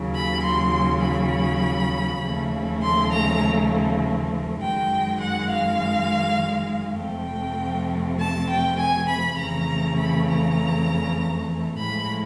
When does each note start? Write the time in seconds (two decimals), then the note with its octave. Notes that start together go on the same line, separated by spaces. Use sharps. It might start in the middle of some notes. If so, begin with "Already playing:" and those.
Already playing: D#2 C#3 F#3
0.15 B5
0.45 C6
1.05 B5
2.24 D#2 C#3 F3 A3
2.83 C6
3.13 A#5
4.62 F#2 D#3 G#3 G5
5.22 F#5
5.51 F5
7.01 F2 C3 F3 A3 G5
8.20 A5
8.50 G5
8.80 G#5
9.09 B5
9.39 F2 C#3 E3 A3 A#5
9.99 B5
10.29 A#5
11.78 A2 F3 G#3 B5